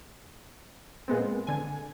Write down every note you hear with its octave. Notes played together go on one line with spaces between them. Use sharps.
A#2 G#3 B3 C4
D3 G#5